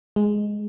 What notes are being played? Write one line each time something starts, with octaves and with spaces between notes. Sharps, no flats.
G#3